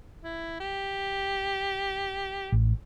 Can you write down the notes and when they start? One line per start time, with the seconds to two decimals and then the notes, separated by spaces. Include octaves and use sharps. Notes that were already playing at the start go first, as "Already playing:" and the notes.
0.24 E4
0.60 G4
2.52 A1